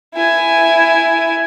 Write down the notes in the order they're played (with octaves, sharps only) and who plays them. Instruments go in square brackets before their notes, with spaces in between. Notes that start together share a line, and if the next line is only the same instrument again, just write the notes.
[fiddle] E4 G#5